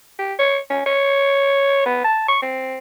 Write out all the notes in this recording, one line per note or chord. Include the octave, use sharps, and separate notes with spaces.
G4
C#5
C#4
C#5
B3
A5
C#6
C4